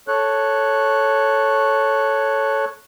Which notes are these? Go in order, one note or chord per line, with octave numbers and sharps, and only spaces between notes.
A4 C#5 F#6